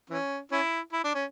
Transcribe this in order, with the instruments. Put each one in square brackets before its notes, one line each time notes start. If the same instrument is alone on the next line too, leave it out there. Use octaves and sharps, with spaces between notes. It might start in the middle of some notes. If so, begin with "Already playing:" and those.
[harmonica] E3 C#4
C#4 E4
E4
D4
C#4